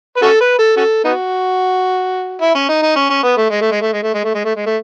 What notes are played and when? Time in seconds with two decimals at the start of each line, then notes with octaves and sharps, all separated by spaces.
0.17 B4
0.22 C#4 F#4 A4
0.41 B4
0.59 A4
0.77 C#4 F#4 A4
1.04 B3 D#4 F#4
2.41 E4
2.55 C#4
2.69 D#4
2.82 D#4
2.96 C#4
3.10 C#4
3.24 B3
3.38 A3
3.51 G#3
3.61 A3
3.72 G#3
3.82 A3
3.93 G#3
4.03 A3
4.14 G#3
4.24 A3
4.34 G#3
4.45 A3
4.56 G#3
4.66 A3